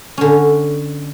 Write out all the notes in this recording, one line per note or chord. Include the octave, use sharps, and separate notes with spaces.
D3 C#4